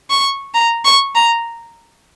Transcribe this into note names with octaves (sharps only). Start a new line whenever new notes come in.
C#6
A#5
C#6
A#5